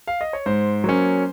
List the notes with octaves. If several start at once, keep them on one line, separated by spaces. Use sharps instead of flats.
F5
D#5
C#5
G#2 C5
F#3 A#3 C#4